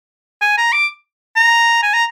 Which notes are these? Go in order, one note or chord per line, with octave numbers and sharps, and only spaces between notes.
G#5
A#5
D6
A#5
G#5
A#5